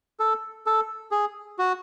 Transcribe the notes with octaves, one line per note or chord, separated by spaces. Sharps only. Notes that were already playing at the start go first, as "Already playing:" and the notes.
A4
A4
G#4
F#4